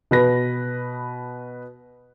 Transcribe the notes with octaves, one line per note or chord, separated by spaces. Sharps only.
B2 B4 A#6